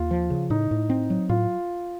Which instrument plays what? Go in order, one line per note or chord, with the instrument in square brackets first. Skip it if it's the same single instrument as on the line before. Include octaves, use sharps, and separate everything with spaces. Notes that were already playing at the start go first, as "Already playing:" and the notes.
Already playing: [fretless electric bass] D#2 [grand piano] F4
[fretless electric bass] F3
C#3
[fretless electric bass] A2 [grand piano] D#4
[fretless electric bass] A2
C4
F#3
[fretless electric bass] A2 [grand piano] F4